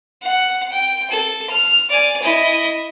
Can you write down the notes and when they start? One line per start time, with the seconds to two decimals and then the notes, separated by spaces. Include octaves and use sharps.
0.22 F#5
0.72 G5
1.10 A4
1.49 F6
1.89 D5 G#5
2.22 E4 D#5